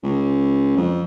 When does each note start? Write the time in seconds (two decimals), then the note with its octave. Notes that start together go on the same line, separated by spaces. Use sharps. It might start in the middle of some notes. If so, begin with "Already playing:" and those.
0.04 C#2
0.77 F2